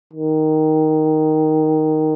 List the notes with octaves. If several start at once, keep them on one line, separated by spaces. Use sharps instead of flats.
D#3